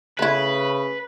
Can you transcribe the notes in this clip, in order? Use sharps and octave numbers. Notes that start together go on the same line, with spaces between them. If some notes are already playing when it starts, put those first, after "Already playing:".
C#3 A3 E4 B4